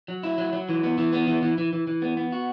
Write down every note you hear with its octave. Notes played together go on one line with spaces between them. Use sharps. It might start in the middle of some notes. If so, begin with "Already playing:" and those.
F#3
E4
F#3
F#3
E3
B3
E3
B3
E3
E3
E3
E3
E3
B3
B3
F#4